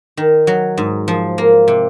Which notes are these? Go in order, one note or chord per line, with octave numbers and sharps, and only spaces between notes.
D#3
F#3
G#2
F3
A#3
C3